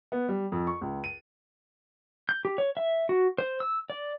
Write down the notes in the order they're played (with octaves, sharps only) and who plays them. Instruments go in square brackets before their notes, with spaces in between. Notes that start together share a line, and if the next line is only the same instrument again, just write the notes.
[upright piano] B3
G3
F2
C#6
C#2
D#7
[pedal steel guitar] G6
G4
C#5
E5
F#4
C5
E6
D5